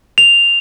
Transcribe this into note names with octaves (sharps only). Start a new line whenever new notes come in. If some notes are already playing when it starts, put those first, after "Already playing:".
F7